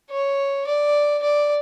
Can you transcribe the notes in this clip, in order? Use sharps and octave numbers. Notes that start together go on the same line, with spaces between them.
C#5
D5
D5